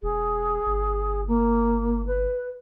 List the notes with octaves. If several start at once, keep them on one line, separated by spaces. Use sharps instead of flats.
E1 G#4
G1
A#3
B4